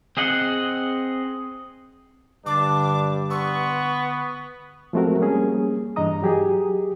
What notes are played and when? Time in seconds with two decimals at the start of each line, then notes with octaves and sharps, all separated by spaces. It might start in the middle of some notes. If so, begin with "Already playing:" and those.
0.17 C4 G#4 D#5 F#5
2.46 G2 D3 D4 D6 A6
3.30 B3 C6 C#6 E6
4.93 F3 G#3 A3 C4 F#4 A#4
5.20 G3 A#3 C#4 G#4
5.96 G2 E3 D4 D#5 A#5 D#6
6.22 F#3 G4 G#4